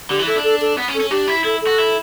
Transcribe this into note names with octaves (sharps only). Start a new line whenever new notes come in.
D3 G4
E3
E4 A4
D4
A4
A4
B3
C#4
A4
C#4
D4 G4
E4
E4 A4
A4
F#4
E4